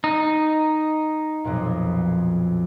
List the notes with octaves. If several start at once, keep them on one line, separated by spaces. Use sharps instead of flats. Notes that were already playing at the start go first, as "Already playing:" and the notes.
D#4
B1 F2 A#2